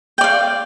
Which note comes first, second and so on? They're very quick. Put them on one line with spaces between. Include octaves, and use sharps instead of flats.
G5 D5 F5